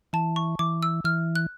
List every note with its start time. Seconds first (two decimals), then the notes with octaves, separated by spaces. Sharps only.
0.13 E3 A5
0.36 C#6
0.59 E3 D6
0.83 E6
1.04 E3 F6
1.36 F#6